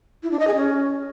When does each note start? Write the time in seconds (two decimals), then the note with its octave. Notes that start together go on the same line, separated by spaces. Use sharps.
0.23 E4
0.31 D4
0.39 D#5
0.47 G#4
0.56 C#4